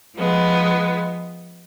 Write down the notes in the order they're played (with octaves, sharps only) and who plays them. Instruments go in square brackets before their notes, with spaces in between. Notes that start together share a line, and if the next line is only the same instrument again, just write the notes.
[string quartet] F3 G#3 B3